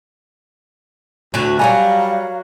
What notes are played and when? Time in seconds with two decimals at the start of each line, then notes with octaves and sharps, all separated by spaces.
1.34 D2 A2 D3 F#4
1.59 F#3 G3 F#4 A#4 F5 G#5